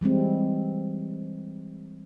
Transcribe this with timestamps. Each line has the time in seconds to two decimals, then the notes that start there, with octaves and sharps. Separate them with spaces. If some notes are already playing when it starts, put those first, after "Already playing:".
0.01 E3 G3 G#3 C4